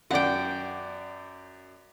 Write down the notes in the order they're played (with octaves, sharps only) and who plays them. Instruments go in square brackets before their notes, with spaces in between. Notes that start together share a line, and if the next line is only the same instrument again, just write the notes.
[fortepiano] F#2 D5 [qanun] F#5 G5